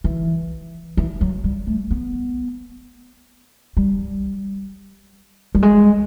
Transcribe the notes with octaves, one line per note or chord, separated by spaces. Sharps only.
E3
E3
F#3
G3
A3
B3
G3
G3
G#3